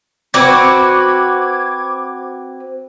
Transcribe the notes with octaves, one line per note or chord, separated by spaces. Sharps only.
C4 F#4 B4 D6 G#6